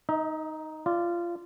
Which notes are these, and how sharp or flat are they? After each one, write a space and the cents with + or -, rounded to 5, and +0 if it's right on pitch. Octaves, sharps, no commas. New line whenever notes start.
D#4 +0 D#5 +45
F4 -20 D5 +0